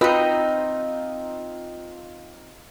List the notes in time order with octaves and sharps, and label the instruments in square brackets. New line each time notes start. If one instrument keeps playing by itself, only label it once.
[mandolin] C4 D#4 [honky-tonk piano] F4 [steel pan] B4 [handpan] D#5